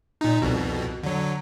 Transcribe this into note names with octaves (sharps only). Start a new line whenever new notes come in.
A#2 D#4
C2 F2 B2
D3 F#3